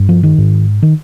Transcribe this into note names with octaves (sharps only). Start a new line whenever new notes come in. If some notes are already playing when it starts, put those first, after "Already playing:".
Already playing: G2
F3
D#3
G#2
D#3